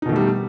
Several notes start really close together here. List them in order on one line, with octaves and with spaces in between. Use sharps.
D#4 B2 D#3 A3 G3